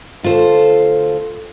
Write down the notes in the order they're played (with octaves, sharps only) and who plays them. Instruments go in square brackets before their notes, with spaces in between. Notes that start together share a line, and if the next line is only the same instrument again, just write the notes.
[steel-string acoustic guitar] D2 F4 A4 C5